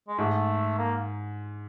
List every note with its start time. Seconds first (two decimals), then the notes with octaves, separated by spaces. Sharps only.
0.08 G#3
0.18 G#2 A3
0.78 A#3